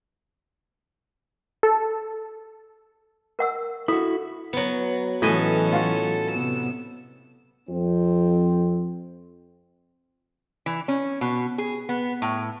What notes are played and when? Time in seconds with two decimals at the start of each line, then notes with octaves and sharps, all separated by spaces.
1.63 A4
3.39 A#4 F#5 E6
3.88 E4 F#4 A4
4.53 F#3 B3
5.22 A2 E3 F#3 C#4 A4 B4 D#5 G#5
5.72 F4 F#4
6.31 C3 B3 E6
7.68 F2 C4
10.66 E3
10.88 C#4
11.21 B2
11.58 G#4
11.89 B3
12.22 A2